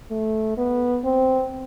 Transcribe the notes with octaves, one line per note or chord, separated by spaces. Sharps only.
A3
B3
C4